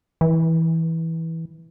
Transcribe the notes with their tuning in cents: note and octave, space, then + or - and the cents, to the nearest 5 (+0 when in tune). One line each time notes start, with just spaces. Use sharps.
E3 -15